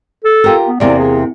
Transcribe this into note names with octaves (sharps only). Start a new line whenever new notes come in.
A4
F4 G4 A#4
B3
E2 C3 A#3 D5
G#4